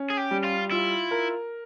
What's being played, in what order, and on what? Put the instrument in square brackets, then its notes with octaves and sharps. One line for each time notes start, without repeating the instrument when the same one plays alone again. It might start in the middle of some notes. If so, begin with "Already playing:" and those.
Already playing: [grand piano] C#4
[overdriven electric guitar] G#4
G4
[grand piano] G3
[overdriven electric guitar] F4
[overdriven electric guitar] E4 [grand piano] F4
[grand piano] A#4